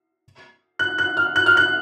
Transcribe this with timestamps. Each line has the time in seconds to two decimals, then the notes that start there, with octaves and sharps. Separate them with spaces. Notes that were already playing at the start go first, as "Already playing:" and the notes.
0.79 F#6
0.98 F#6
1.17 F6
1.36 F#6
1.46 F6
1.57 F#6